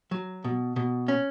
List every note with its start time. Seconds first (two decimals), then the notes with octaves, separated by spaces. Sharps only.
0.11 F#3
0.44 B2
0.76 B2
1.08 C#4